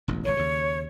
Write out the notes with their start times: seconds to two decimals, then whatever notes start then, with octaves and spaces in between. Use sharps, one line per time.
0.08 E1 A1 D2
0.25 G#1 G2 D3 C#5
0.37 D#2 C#3